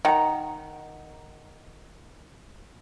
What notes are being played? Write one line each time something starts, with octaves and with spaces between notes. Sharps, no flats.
D#3 F#5 A#5